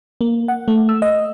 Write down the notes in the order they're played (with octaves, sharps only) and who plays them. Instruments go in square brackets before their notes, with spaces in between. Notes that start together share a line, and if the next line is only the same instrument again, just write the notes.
[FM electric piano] A#3
F#5
A3
E6
D#5